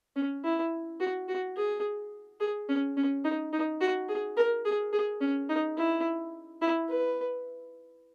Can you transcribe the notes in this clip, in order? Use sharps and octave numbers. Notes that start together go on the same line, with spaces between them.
C#4
E4
F#4
F#4
G#4
G#4
C#4
C#4
D#4
D#4
F#4
G#4
A#4
G#4
G#4
C#4
D#4
E4
E4
B4